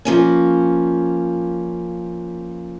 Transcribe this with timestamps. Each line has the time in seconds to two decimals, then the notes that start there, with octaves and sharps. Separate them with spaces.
0.05 F3 A#3 C#4